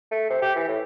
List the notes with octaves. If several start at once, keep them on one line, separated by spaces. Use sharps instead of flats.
A3
C3
G4
E3
A2